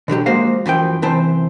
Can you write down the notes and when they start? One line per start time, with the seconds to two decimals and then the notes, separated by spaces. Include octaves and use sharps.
0.08 B2 D3 F#3 G4
0.26 F3 G#3 A#3 F#4 C5 F5
0.66 F#2 E3 F3 G5
1.02 C2 F#2 E3 C4 C5 A5